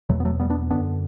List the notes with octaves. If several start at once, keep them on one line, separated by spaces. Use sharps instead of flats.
E2 B2 F#3 A3
B3
F#3 A3
G3 B3
B3 D4
F#2 D3 B3 D4